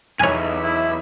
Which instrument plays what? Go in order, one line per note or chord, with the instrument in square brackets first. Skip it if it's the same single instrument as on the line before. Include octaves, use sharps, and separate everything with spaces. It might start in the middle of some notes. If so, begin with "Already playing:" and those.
[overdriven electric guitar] B1 [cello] E2 E5 [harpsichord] C#5 G#5
[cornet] E4